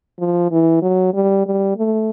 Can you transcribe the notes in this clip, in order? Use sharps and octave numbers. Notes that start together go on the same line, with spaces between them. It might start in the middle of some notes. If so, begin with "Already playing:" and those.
F3
E3
F#3
G3
G3
A3